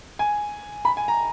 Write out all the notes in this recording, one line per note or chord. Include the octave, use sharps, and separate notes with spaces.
G#5
B5
G#5
A#5